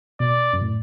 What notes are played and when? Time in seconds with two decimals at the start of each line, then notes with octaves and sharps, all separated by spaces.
0.20 B2 D5
0.53 F#2
0.61 A2